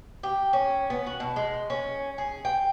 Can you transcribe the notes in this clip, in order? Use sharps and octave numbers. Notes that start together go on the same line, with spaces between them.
G4
C#4
B3
F#4
B2
G#3
C#4
G#4
G5